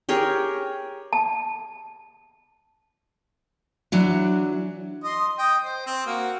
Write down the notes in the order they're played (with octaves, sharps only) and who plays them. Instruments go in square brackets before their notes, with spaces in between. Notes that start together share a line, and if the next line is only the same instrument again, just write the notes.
[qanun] G4 G#4 A#4 C#5
[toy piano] A5
[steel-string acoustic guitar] E3 F#3 D4
[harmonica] D#5 C6
D#5 G5 D#6
C5
C4
A#3 F#4